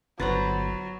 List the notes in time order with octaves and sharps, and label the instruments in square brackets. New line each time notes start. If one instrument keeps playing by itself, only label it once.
[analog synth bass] G1 [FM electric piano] D3 A6 [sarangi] F#3 [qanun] B4 C5 A#5